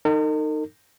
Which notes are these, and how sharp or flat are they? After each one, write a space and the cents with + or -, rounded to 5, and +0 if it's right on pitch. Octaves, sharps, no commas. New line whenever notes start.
D#4 -10 A#4 -45